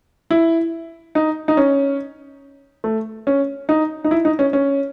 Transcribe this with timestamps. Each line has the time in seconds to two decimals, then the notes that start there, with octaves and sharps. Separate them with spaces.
0.31 E4
1.15 D#4
1.48 D#4
1.57 C#4
2.84 A3
3.27 C#4
3.69 D#4
4.04 D#4
4.11 E4
4.25 D#4
4.39 C#4
4.53 C#4